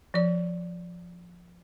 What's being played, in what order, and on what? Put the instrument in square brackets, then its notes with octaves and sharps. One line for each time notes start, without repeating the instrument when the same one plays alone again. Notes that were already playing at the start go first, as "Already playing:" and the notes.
[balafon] F3 D5